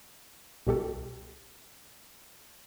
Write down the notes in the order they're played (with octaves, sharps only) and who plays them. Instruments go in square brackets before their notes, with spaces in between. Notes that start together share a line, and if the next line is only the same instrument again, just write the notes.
[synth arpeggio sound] C2 B2 G4 A4